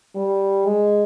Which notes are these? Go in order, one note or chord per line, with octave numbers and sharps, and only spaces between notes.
G3
G#3